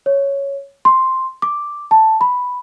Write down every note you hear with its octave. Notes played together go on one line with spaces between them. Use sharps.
C#5
C6
D6
A5
B5